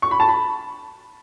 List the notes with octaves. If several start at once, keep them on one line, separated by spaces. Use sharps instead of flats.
C#6
B5
A5
B5